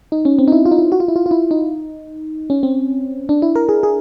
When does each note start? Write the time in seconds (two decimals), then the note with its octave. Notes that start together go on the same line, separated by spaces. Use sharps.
0.12 D#4
0.25 C#4
0.39 C4
0.48 D#4
0.52 E4
0.65 F4
0.72 D#4
0.78 E4
0.92 F#4
1.00 F4
1.08 E4
1.16 F4
1.26 F4
1.31 E4
1.51 D#4
2.50 C#4
2.63 C4
3.29 D4
3.42 E4
3.56 A#4
3.69 G#4
3.83 G#4